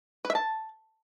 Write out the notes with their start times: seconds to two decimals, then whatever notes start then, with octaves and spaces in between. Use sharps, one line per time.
0.25 B4
0.30 E5
0.35 A5